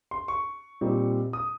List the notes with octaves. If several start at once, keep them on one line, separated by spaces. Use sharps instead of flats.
C6
C#6
A#2 G3 C4 D#4
D#6